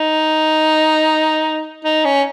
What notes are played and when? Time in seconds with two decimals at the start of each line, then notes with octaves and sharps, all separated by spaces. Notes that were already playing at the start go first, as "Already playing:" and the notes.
Already playing: D#4
1.84 D#4
2.05 C#4